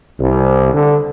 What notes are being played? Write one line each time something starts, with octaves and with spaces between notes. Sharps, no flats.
C2
D3